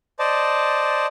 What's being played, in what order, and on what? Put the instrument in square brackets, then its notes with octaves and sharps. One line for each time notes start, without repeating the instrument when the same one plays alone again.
[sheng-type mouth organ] C5 D5 D#5 A5